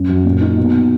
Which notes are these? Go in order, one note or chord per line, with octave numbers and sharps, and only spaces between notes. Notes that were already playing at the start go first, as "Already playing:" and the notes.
Already playing: F#2
F#3
A#2
D#4
B2